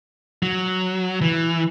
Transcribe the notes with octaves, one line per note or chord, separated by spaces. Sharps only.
F#3
E3